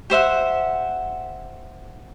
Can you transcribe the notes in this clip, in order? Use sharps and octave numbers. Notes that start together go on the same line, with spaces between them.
G4 C5 E5 F#5